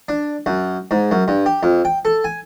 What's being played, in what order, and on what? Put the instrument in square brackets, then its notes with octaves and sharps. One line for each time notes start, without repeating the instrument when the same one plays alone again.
[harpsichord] D4
F#2
G#2
F#2
G2
G4
F2
G5
A4
G#5